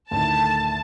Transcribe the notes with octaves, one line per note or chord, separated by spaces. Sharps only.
D2 A2 D#3 A5